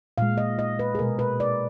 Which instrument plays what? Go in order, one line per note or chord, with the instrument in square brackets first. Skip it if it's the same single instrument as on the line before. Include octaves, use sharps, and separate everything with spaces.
[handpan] A#2 G#3 F5
D#5
D#5
B4
G#4
B2 G#3 A#4
B4
D5